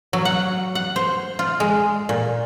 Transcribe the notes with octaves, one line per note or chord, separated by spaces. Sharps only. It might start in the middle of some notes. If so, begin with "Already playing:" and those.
F#3
F#5
F#5
C5
F4
G#3
A#2